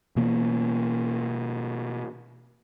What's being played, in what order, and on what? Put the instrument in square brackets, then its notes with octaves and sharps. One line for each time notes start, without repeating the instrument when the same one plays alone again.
[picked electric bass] B2 E3 A#3